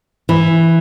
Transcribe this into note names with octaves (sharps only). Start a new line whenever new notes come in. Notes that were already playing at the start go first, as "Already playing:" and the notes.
E3